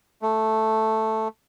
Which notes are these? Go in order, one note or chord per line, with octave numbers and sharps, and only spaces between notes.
A3